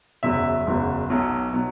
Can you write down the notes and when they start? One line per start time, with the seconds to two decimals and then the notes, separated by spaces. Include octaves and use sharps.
0.23 F#1 E2 B2 F#3 E5
0.66 F#1 E2 B2 F#3
1.10 B1 B2 F#3
1.53 B2 F#3